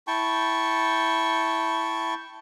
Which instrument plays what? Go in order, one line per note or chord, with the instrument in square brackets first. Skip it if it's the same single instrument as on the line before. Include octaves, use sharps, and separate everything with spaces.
[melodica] E4 G5 A5 C#6